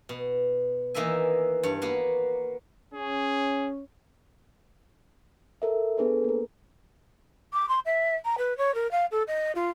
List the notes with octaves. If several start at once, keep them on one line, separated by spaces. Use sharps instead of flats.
B2
D#3 E3 A#3 D#5 E5 G#5
G2 C#5
A#3 B3 F#4
C#4 G#4
A4 A#4 E5
B3 D4 G#4 A4 B4
A#3 A#4
D6
C6
E5
A#5
B4
C#5
A#4
F5
A4
D#5
F4